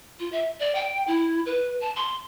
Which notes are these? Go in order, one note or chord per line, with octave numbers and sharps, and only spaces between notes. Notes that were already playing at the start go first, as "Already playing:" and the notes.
F4
E5
D5
G5
E4
B4
A5
C6